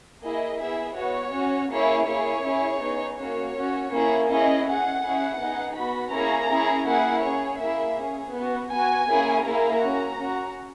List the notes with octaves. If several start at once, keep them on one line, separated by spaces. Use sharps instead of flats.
A#3 E4 G#4 D#5
B3 E4 G#4 E5
B3 F#4 C#5
C#4 F#4
A#3 E4 G#4 C#5
A#3 E4 G#4 C#5
C#4 E4 G#4
B3 D#4 G#4
A#3 C#4 F#4 C#5
C#4 F#4
A#3 C#4 E4 G#4
C#4 E4 G#4 D#5
C#4 G#4 F#5
C#4 E4 G#4
B3 D#4 G#4
B3 F#4 B5
A#3 C#4 E4 G#4 A#5
C#4 E4 G#4
A#3 E4 G#4 F#5
C#4 G#4 C#5
A#3 E4 G#4 E5
C#4 G#4
B3 F#4
B3 F#4 G#5
A#3 C#4 E4 G#4
A#3 E4 G#4 A#5
C#4 F#4
C#4 F#4